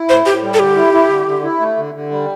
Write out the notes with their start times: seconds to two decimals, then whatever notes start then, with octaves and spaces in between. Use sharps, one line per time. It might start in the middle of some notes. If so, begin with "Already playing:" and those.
Already playing: E4
0.08 A2 C5
0.25 A2 G4
0.42 G3
0.54 A4
0.59 D3 G4
0.76 E4
0.93 E4
1.09 D3
1.26 D3
1.43 E4
1.60 A3
1.77 D3
1.94 D3
2.11 G3